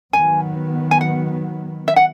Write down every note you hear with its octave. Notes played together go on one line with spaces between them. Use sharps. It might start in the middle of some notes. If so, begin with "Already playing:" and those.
D#3 F#3 B3 G#5
G#5
F#5
E5
F#5